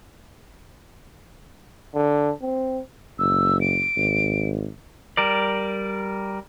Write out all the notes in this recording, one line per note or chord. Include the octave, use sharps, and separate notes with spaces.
D3
C4
F#1 E6
D7
G#1
G3 A#4 D5